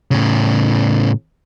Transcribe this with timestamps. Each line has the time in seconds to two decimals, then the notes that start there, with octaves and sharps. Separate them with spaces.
0.11 A2 C#3